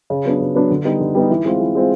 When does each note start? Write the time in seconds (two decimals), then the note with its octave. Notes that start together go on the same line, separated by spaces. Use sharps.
0.10 C#3
0.25 F#3 B3 D4
0.40 C#3
0.55 F#3 B3 D4
0.70 D3
0.85 G3 B3 D#4
1.00 D3
1.15 G3 B3 D#4
1.30 E3
1.45 G#3 C4 F4
1.60 E3
1.75 G#3 C4 F4